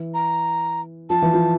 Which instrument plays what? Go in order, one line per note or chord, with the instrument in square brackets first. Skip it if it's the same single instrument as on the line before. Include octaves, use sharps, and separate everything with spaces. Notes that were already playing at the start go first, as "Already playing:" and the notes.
Already playing: [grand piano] E3
[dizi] A#5
[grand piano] F3 [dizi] A5
[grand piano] E3
F3